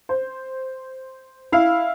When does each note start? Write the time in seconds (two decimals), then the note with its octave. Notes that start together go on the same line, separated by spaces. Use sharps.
0.09 C5
1.52 E4 F5